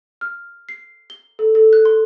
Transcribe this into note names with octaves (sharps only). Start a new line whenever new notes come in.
F6
C7
G7
A4
A4
F#6
C6